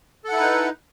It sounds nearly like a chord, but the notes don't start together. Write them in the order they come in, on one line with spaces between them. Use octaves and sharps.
A4 F#5 E4 B4 D#4